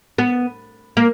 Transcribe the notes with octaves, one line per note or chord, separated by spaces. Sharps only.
B3
A#3